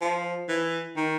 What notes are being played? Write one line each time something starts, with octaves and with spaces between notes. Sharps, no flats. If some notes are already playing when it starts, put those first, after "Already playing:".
F3
E3
D#3